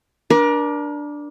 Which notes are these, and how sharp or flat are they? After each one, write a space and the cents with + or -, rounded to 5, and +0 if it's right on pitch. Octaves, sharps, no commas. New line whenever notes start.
D4 +0 A#4 +35